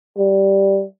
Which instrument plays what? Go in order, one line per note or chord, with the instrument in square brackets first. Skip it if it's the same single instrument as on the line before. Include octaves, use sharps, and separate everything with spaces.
[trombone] G3